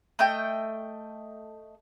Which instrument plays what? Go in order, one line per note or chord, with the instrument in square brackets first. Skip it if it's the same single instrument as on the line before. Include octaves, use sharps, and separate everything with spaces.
[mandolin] A3 D#5 G5